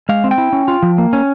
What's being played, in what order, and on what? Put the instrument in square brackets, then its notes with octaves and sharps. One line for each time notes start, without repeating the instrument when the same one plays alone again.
[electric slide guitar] G#3 F5
C4
G5
E4
C#4
F4
F3
A#3
C#4